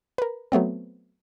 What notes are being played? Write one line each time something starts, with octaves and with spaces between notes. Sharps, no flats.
A#4 B4
F#3 A3 B3 C4